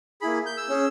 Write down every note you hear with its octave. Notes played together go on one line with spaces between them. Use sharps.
A#3 E4 G#4 B5
G6
E6
C#4 G#4